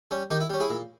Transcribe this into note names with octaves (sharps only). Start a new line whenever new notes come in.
G3 C#4
D#3 D#4 G4
E4
G3 C#4
E4 G#4
A#2